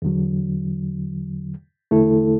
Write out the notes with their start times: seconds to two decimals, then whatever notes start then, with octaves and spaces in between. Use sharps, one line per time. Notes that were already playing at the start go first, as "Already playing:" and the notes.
0.02 E2 D3 F#3
1.91 E2 D3 A3 E4 A4